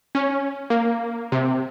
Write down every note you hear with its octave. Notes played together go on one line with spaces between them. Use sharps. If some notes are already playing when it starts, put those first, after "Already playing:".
C#4
A#3
C3